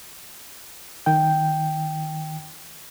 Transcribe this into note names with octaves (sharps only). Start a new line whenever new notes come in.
D#3 G5